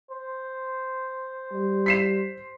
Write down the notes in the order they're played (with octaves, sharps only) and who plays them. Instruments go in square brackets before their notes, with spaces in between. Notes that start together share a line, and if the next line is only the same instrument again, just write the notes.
[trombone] C5
[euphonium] G3
[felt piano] B6 C7 E7